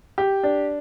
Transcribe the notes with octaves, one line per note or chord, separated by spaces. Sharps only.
G4
D4